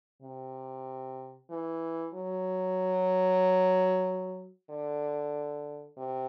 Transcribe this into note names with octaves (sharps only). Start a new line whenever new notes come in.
C3
E3
F#3
D3
C3